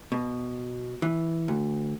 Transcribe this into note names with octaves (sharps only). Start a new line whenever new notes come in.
B2
E3
D2